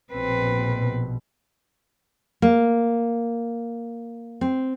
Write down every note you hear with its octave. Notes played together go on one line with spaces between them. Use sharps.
A#1 B2 C4 B4
A#3
C4